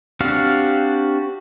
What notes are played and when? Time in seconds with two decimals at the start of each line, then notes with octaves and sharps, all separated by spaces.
0.20 C4 D4 F#4 G4 F5